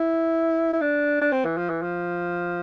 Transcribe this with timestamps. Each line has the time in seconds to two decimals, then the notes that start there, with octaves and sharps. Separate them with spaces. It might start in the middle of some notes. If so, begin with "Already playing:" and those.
Already playing: E4
0.73 E4
0.81 D4
1.21 D4
1.32 C4
1.45 E3
1.57 F3
1.69 E3
1.82 F3